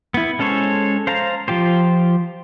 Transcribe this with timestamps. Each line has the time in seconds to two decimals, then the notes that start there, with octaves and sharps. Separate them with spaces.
0.14 B3 E4
0.39 G#3 C#4 A4 C5 C#5
1.07 C5 F5 A5 A#5
1.48 F3 F4 G4 C5